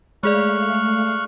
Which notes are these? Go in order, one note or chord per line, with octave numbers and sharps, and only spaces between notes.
G#3 A3 G#4 D5 F5 C#6 F6 F#6